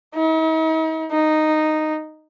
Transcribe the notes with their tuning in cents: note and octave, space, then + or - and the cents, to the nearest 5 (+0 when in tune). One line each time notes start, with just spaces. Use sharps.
D#4 +45
D#4 -5